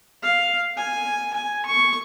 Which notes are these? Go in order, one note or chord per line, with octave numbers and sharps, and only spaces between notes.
F5
G#5
G#5
C#6